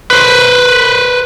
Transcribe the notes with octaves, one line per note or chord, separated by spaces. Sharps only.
B4 C5